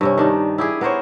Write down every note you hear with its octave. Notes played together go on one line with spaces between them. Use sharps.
G2 C3 C#4
D#3 D4 D#4
E4 G4 G#4
B3 A#4 C5 C#5